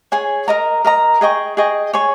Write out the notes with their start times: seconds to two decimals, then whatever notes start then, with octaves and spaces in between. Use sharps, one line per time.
0.12 G#4 C#5 G#5
0.48 A#4 D#5 A#5
0.84 A#4 D#5 A#5
1.21 G#4 D#5 G5 C#6
1.57 G#4 D#5 G5 C#6
1.93 G#4 C#5 G#5 C#6